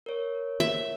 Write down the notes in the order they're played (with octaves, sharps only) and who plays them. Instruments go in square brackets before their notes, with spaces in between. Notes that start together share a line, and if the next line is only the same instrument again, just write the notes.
[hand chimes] A#4 C#5
[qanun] E5